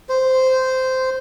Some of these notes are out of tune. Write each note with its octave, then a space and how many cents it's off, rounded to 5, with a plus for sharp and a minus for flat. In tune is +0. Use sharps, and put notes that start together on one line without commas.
C5 -10